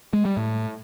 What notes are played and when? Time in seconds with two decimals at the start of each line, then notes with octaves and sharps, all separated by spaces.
0.13 G#3
0.25 G3
0.37 A2